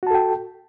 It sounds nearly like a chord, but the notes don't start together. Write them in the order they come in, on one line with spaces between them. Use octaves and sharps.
F#4 A5 A4 G5